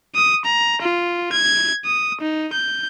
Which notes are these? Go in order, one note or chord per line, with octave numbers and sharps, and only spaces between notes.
D#6
A#5
F4
G#6
D#6
D#4
G6